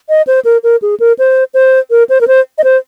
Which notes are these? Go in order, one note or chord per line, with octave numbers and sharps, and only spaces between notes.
D#5
C5
A#4
A#4
G#4
A#4
C5
C5
A#4
C5
A#4
C5
D#5
C5